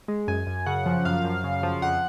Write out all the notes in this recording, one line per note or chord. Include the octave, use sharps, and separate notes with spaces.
G#3
F#2 G#5
F#2
C#3 F#5
F3
F#2 F5
F#2
C#3
F3
F2 F#5